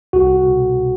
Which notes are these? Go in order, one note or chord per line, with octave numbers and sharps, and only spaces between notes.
C2 F#4
B2